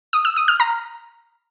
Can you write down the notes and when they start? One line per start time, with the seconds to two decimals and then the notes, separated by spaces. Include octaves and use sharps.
0.13 D#6
0.25 E6
0.36 D#6
0.48 F6
0.60 A#5